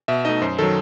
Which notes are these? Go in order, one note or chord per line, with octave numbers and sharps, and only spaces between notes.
B2 E5
A3 D#4 D#5
F#2 C5
D#3 F#3 A4